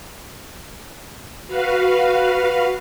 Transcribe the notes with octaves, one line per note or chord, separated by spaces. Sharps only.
F#4 B4 F5